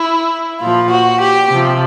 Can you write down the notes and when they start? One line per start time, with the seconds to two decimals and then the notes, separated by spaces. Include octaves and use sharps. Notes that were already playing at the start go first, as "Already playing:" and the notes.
Already playing: E4
0.60 A#2 F3 F4
0.91 F#4
1.21 G4
1.50 C3 F3